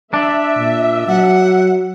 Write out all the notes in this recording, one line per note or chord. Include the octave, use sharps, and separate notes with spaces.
D4 E5
A#2
F#3 F#5